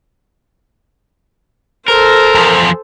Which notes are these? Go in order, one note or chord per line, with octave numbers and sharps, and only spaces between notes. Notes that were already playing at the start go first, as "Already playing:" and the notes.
A4 A#4 C5
E2 F3